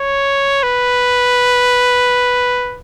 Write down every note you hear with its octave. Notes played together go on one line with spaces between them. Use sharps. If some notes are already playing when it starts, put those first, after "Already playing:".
Already playing: C#5
B4